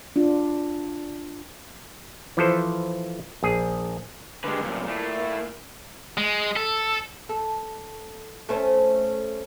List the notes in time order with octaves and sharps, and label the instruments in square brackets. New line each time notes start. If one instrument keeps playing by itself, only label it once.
[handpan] D4 F4
[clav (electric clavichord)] E3 F3 A4 C5
A#1 G#4
[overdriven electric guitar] D3 G#3 [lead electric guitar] G4 B4
[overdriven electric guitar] C2 F#2 [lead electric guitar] A#2
[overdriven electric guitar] A3 E4
[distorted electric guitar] G#3
A4
[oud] A4
A3 C#4 C5